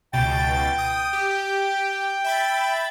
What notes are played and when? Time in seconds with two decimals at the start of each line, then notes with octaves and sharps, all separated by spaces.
0.13 C#2 B2 G5 A6
0.78 D#6
1.13 G4
2.24 E5 B5 A6